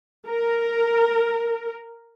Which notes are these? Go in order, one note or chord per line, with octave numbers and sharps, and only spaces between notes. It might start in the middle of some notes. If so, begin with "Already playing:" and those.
A#4